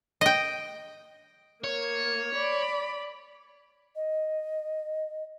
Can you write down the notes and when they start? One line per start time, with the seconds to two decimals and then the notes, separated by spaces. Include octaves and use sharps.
0.21 D#5 G5
1.64 A#3 C#5
2.35 D5 B5
3.95 D#5